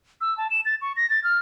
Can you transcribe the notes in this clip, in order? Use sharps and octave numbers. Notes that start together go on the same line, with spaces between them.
E6
A5
E7
A6
C#6
A#6
A6
F6